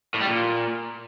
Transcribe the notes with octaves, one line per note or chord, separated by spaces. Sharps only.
A2
G3
A#2